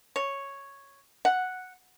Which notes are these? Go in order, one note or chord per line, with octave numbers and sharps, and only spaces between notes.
C#5
F#5